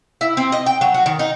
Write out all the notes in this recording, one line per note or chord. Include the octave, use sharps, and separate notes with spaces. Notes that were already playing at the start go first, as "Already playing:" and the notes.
E4
C4
D#5
G5
F#3
F#4
D#3
D#4